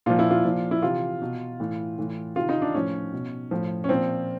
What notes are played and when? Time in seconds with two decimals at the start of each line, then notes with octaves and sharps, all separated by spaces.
0.06 A#2 F3 F4
0.19 E4
0.31 F4
0.44 A#2 F3
0.71 E4
0.82 C3 E3 F4
1.22 B2
1.60 A2 E3
1.99 A2 E3
2.36 C3 D#3 F4
2.49 D#4
2.62 D4
2.74 A2 F3 C#4
3.13 B2
3.51 A2 F3
3.84 C#4
3.89 A#2 F3 C4